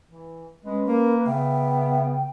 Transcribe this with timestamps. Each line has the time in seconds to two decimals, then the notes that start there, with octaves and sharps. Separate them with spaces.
0.08 E3
0.65 G#3 C#4 B4
0.87 A#3 A#4
1.26 C#3 B3 E5 G5